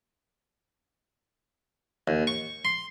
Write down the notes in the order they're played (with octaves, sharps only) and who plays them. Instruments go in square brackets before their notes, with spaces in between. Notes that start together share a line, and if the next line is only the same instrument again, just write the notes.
[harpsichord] D#2
C#6
C6